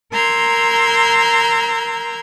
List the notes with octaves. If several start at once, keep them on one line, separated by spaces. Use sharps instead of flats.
A#4 A#5 C6 E6 G6 G#6